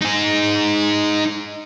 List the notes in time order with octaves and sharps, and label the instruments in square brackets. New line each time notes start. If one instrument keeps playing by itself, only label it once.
[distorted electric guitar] D#4 G#4